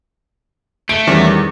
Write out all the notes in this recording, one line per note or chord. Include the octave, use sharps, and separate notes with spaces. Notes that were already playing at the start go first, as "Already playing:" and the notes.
A3 D7
E2 D#3 G3 C#4